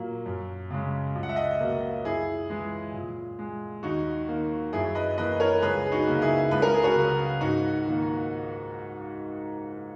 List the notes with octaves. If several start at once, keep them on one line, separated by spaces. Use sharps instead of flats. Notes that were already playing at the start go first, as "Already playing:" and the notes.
Already playing: A#2 F#3 A#3
F#2
C#3 G#3
C#2
F#5
E5
D#5 F#5
B2 A#3
F#2 E4 G#4
E3 G#3
A#2
G#3
D#2 D#4 F#4
D#3 A#3
F#2 E4 G#4
B4 D#5
E3 A#3 B4 D#5
A#4 C#5
C#2 G#4 B4
G#4
D#4 F#4
C#3 F#3 A#3
E4 G#4
C#2 B4
A#4
G#4
F#4 A#4
C#3 F#3
G#2 D#4 F#4
D#3 A#3